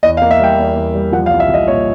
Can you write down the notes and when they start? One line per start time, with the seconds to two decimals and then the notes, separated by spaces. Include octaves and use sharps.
0.03 E2 D#5
0.17 F5
0.22 A#3
0.31 E5
0.40 G3 G5
0.58 E2
0.76 E2
0.94 G3
1.12 F3 F#5
1.26 F5
1.30 C2
1.40 E5
1.49 F3
1.54 D#5
1.68 A#2 C#5